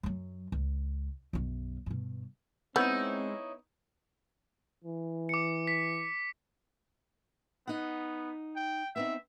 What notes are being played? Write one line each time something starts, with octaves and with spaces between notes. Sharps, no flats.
F#2 F#3
C#2
B1 F#2
G2 B2
G#3 B3 C4 D#4 E4 C#5 E6 G6
E3
D6 C#7
B6
B3 D#4 F#5
G5
B3 C4 D#4 E5